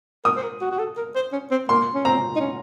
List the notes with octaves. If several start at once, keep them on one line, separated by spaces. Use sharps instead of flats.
A#4 D#6
C5
A#4
F#4
F#4
A4
A#4
C5
C#4
C4
A#3 C6
C#4
C4 A#5
D#4
C#4